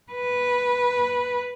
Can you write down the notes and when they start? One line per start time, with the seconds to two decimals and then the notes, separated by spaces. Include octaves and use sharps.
0.12 B4